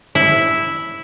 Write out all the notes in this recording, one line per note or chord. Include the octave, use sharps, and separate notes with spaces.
E4